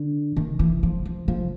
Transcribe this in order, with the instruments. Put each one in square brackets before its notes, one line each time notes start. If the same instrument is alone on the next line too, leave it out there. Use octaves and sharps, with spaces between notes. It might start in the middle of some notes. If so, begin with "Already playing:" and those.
Already playing: [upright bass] D3
D#3
E3
F3
F3
F3